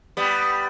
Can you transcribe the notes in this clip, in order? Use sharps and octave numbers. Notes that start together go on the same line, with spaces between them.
G3 B3